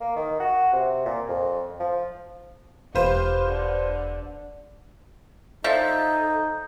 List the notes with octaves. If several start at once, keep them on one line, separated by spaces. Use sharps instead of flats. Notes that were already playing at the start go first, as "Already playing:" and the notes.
A#3
D#3
F#4
C3
A#2
F2
F3
E1 F4 G4 B4 C5
D3
F3 D#4 A4 D5 E5 G6